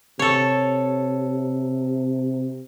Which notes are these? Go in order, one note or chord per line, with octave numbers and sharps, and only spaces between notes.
C3 A4 C#5